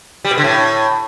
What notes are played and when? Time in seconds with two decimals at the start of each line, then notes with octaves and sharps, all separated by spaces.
0.25 G3
0.31 B2
0.38 D3
0.44 A2